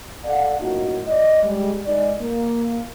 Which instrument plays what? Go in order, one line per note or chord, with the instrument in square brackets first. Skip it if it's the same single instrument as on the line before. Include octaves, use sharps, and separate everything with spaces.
[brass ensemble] A4 D5 F5 F#5
F#2 A2 A#3 D#4 F4 F#4
D5 D#5
G3 G#3
G#3 D#4 D5
A#3